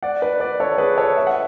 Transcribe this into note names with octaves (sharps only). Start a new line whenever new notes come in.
D5 F#5
B4 D5
B4 D5
A4 C#5
G#4 B4
A4 C#5
E5
F#5